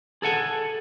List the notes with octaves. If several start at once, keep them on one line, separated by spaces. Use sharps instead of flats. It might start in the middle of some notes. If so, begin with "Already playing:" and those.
G#4 A4 F#5 G#5